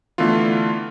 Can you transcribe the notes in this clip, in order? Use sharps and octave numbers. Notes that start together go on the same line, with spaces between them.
D3 E3 A3 B3 F4